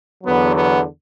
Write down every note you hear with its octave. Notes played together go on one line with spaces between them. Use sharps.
E2 D3 F#3 B3
B3